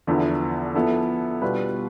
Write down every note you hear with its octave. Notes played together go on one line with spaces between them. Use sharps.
E2 D3 F3 B3 E4
F3 B3 E4 A4
B2 G3 D4 F4 B4